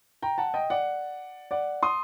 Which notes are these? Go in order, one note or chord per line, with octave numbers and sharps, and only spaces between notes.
G5 A#5
F#5 A5
D#5 G5
D5 F#5
D5 F#5
C6 D#6